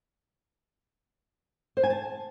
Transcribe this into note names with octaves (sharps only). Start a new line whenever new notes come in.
C5
G#5
A5